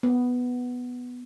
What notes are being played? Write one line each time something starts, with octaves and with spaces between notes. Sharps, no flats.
B3